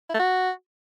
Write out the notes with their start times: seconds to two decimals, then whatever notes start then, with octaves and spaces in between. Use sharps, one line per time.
0.09 E4
0.14 A3
0.19 F#4